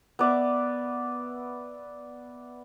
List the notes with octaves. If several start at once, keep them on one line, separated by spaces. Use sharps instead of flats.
B3 D5 E5